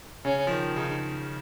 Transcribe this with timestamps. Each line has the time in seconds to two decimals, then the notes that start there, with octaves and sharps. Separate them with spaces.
0.25 C#3 C#4
0.47 F3
0.51 D#3
0.76 C#3 D#4